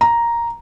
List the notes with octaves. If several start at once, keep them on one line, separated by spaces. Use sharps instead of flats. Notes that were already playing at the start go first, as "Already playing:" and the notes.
A#5